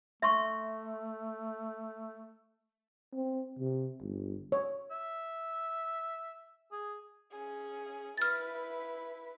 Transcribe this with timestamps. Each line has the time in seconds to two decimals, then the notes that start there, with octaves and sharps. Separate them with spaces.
0.22 A3 E5 C6 C#6
3.14 C4
3.59 C3
4.01 G1
4.52 C#5
4.91 E5
6.72 G#4
7.32 C#4 G#4
8.18 E4 B4 F6 A6